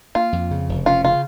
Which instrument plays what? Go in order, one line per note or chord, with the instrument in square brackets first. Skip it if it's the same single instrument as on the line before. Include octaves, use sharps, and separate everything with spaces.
[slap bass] A#3 [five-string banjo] F4
[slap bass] F2
C#3
F1
[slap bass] C#4 [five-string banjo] F4
[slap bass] C#3 [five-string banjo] F4